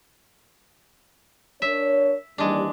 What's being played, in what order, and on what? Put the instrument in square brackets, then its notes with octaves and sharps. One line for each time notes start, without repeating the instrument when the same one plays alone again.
[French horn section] D4 A#4 C#5 [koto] E5
[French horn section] D#2 E3 G3 [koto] G#3 D4